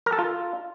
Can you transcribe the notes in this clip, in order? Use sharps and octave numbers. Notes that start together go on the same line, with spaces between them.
A#4
A4
F4